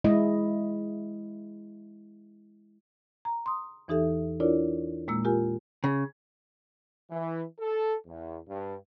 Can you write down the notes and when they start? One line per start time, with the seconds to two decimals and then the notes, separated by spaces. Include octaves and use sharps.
0.04 G#3 E4 D#5
3.25 A#5
3.46 C6 D#6
3.88 E2 E3 D#4 G4 A4 E5
4.40 D4 E4 F4 A#4 C#5 D5
5.08 A#2 G#3 A#3 E6
5.24 F4 G4 A#4 G#5
5.84 C#3
7.10 E3
7.59 A4
8.06 E2
8.48 G2